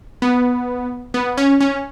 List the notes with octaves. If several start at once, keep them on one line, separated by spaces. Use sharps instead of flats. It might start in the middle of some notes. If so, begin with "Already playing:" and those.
B3
B3
C#4
C#4